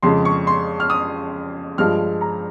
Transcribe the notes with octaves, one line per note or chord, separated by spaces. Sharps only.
F2 C#3 G#3 C6
C#6
C6
F6
D#6
G2 F3 G#3 F6
A#5